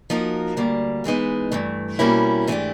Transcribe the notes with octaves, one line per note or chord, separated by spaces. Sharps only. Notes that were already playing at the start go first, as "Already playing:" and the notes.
F3 A#3 D#4 F#4 A#4
D2 D3 G3 A#3
G#2 E3 G#3 B3 D#4
G2 E3 A3
B2 G3 A#3 C#4 E4
G#2 E3 A3 D4 G4